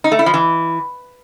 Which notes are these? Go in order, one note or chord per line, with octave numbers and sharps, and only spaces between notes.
D#4
A3
E4
F3
E3